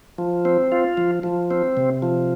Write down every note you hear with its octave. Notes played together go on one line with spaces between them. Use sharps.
F3
C4
F4
F3
F3
C4
C3
F3